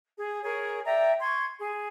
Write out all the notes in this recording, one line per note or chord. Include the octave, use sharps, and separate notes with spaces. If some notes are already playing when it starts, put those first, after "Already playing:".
G#4
G#4 A#4 C#5
D5 E5 G5 A#5
C6 C#6 G#6
G#4